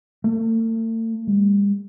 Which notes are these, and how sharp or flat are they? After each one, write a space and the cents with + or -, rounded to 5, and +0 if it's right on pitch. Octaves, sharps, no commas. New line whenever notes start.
A3 +45
G3 +45